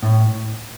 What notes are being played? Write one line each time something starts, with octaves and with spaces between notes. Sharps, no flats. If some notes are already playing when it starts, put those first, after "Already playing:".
A2